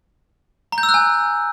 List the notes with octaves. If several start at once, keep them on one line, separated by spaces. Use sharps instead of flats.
A#5
G6
E6
F#6
G#5